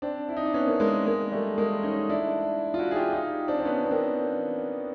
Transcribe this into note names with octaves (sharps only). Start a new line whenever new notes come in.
C4 D4
E4
D#4
D4
B3 C#4
A#3 C4
G#3 A#3
G#3 A#3
G3 A3
G#3 A#3
C#4 D#4
D4 E4
F4
E4 F#4
G#4
F4 G4
D#4 F4
C4 D4
C4
B3 C#4
B3
A#3 C4